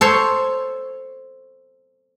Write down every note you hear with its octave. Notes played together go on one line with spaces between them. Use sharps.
A4 C5 C#5